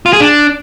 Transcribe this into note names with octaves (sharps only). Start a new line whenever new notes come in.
F4
G#4
D4